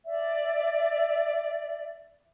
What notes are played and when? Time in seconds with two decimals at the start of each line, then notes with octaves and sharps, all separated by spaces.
0.06 D5 E5